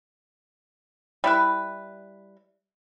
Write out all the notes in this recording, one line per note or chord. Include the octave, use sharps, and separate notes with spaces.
G3 E4 B4